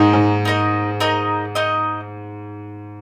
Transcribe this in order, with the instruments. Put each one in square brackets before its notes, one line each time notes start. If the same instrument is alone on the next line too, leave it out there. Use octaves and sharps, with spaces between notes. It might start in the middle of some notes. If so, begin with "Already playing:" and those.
Already playing: [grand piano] G#2 [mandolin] D#4 A#4 D#5
[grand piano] G#2
[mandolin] D#4 A#4 D#5
D#4 A#4 D#5
D#4 A#4 D#5